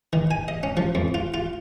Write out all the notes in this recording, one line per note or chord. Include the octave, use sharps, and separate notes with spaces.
D#3
G#5
D#5
C#4
F3
F2
F4
F4